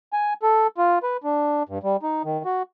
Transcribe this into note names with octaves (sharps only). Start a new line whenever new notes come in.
G#5
A4
F4
B4
D4
G2
G3
D#4
D#3
F#4